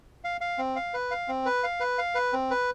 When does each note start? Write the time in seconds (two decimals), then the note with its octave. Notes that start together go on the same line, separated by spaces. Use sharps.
0.24 F5
0.41 F5
0.58 C4
0.76 F5
0.94 B4
1.11 F5
1.28 C4
1.46 B4
1.63 F5
1.80 B4
1.98 F5
2.15 B4
2.33 C4
2.51 B4